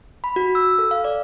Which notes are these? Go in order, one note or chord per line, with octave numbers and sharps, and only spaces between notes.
B5
F#4
E6
A4
F5
D5